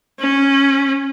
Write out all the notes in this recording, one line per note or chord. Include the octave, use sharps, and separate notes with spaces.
C#4